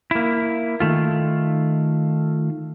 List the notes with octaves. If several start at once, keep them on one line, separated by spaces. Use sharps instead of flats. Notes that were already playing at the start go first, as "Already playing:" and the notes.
A#3 E4
D#3 A3 F4